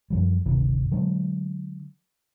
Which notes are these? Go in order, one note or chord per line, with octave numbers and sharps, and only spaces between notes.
F#2 F3 G3
G1 D2 C3 D#3
D3 F#3 G#3 D4